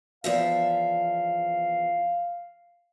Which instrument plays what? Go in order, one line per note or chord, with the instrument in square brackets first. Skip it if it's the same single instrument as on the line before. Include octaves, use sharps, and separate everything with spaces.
[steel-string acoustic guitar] E2 F3 E5 [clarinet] F5